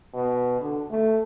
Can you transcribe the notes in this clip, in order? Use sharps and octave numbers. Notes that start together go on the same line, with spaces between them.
B2
D3
A3